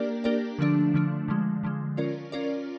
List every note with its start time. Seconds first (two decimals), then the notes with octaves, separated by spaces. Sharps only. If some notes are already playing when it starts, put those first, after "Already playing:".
Already playing: A#3 D4 G4 A#4 D5
0.24 A#3 D4 G4 A#4 D5
0.58 D3 F3 A3 D4
0.94 D3 F3 A3 D4
1.28 D3 F3 G#3
1.63 D3 F3 G#3
1.97 C#4 F4 A#4 D5
2.32 C#4 F4 A#4 D5